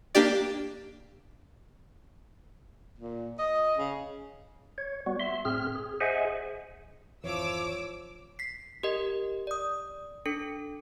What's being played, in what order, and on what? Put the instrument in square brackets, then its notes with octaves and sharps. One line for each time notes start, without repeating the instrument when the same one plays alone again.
[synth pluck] A#3 D4 G4 D5
[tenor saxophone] A#2
D#5
C#3
[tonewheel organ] C#5
G3 B3 F#4
E5 C6
A2 C4 G#4 F6
G#4
G#4 C5 D#5 E5 F#5 G#5
[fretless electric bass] G#1 F2 E3 [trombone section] F3 [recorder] C#5 [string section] D6 E6
[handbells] B6 C7
G4 A#4 D#5
D5 D#6
D4 A4 C#7